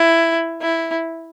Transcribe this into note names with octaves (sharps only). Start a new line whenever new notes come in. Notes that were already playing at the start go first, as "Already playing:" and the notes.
Already playing: E4
E4